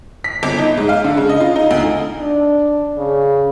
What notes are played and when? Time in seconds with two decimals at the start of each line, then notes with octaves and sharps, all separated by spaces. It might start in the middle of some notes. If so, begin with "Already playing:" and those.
0.24 B6
0.43 G1
0.58 D#4
0.77 G#2
0.89 F5
1.04 D3
1.17 C#3
1.29 D#5
1.40 F4
1.56 D#4
1.71 D2
2.20 D4
2.98 C#3